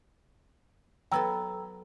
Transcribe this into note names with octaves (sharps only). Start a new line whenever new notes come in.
F#3 B3 A4 G5 A#5 E6